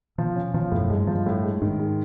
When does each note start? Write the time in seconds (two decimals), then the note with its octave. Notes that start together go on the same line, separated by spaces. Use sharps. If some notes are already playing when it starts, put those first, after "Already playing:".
0.18 B2 F3
0.36 C#4
0.54 B2 F3
0.72 F#2 A2
0.90 G2 G#3
1.07 F3
1.26 A2
1.43 G#3
1.62 G#2 D#3
1.79 G#3